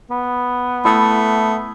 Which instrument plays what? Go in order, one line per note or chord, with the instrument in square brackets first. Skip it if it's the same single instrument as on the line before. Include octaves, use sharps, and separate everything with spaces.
[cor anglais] B3
[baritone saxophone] A3 [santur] E4 D#6